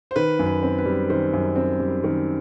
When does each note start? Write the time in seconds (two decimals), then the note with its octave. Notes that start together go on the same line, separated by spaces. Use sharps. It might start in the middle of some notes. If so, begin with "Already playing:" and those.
0.11 C5
0.16 D#3 B4
0.39 F#2
0.46 B4
0.63 C4
0.79 B4
0.85 G3
1.10 D#3 C5
1.33 F#2
1.56 C4
1.80 G3
2.04 D#3